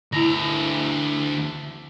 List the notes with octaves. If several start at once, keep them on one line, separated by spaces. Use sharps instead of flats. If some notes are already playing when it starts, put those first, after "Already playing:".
D2 E4 A#5 A#6